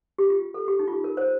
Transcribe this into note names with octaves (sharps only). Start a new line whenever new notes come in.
G4
F4
A4
G4
D#4
F4
G4
A#4
C5